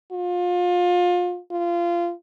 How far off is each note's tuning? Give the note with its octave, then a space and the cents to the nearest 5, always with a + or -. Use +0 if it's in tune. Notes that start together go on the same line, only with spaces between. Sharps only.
F4 +30
F4 -20